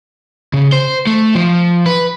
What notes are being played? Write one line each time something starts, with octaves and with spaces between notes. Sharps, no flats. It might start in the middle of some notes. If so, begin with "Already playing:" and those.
C#3
C5
A3
F3
B4